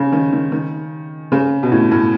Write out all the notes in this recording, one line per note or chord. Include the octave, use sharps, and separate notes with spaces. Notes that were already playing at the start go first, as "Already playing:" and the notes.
Already playing: C#3
D#3
D#3
D#3
C#3
B2
A2
A2